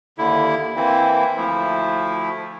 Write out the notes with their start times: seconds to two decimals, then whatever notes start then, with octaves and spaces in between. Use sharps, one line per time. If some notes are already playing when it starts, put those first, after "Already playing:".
0.18 D#2 D3 E4
0.76 E3 A#3 C4 E4
1.37 D2 F3 A3 E4